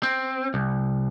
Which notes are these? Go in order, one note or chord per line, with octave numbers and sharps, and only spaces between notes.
C4
C2